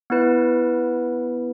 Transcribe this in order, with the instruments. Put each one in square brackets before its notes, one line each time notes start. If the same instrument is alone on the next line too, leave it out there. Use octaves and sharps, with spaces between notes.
[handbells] B3 E4 B4